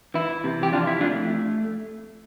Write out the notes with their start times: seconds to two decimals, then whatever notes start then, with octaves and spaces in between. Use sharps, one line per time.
0.14 E3 E4
0.44 C3
0.63 G4
0.72 F2 D4 F4
0.87 E4
1.01 A3 D4 F4